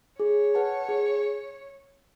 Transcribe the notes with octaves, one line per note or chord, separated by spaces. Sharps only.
G#4 C#5
B4 F#5 A5
G#4